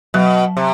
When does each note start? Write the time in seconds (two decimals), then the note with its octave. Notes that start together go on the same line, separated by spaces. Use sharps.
0.14 B2 F#3
0.57 C3